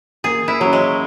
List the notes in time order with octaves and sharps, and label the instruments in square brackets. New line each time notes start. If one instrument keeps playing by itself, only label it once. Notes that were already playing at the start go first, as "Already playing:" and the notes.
[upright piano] A#3 [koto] G#4
[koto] E4
[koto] F#3 [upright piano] C#4 F#4 C#5
[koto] G#3